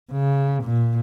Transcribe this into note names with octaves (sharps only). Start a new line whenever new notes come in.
C#3
A#2